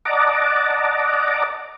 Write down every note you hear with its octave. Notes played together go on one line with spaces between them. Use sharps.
D5 D#5 F#5 A5 A#5 D6